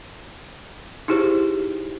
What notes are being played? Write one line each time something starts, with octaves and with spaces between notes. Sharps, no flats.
D#4 E4 G4 G#4 C5